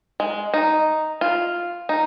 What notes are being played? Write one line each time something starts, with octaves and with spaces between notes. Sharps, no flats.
G#3
D#4
F4
D#4